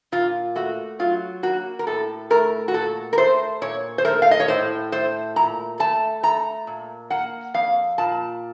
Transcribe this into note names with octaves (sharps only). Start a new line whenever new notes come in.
A#2 F4
A3 F#4
F#3 F4
A#3 F#4
A#4
A2 A4
A3 A#4
F#4
A#2 A4
A#4
A3 C5
A#2 C#5
C5
A3 A#4
F5
D#5
C#5
A2 C5
A3 C5
A#2 A#5
A3 A5
A3 A#5
A#2
A#3 F#5
F2 F5
A#2 A5